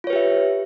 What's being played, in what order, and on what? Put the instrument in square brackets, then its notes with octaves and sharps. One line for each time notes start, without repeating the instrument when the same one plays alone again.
[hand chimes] F4
C#5
B4
G4
E5